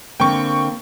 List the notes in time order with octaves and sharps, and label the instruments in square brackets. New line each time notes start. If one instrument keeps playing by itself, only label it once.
[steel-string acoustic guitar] D3 A#3 C4 [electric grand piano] G5 C#6